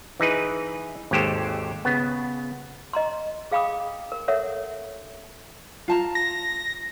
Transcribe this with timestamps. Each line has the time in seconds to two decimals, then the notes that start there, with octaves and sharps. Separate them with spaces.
0.20 E3 D#4 G#4 B4
1.11 G#1 D#2 G#3 G4 A4 C5
1.85 C#3 B3
2.93 D#5 A#5 C6
3.51 G#4 F5 G5 B5 D6 D#6
4.12 A#4
4.28 A4 A#4 C#5 E5 F#5
5.88 F4 A5 A#5
6.15 A#6